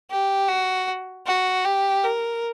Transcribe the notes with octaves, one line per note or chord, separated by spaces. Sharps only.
G4
F#4
F#4
G4
A#4